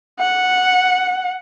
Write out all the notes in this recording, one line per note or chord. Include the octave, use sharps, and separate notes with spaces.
F#5